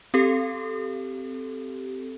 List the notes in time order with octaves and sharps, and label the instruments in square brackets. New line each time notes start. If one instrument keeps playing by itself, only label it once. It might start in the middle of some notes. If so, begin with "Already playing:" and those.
[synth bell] C4 G4 A4